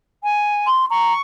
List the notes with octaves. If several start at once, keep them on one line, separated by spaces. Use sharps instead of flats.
G#5
C6
A#5 C#6